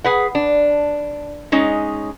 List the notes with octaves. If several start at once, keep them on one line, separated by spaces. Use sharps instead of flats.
G#4 B4 F#5
D4
G#3 C#4 D#4